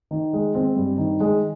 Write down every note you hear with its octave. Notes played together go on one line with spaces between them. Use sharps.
D#3
G#3
C4
G2
D#3
G#3